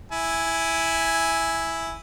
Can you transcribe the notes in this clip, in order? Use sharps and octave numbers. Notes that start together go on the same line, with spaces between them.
E4 G#5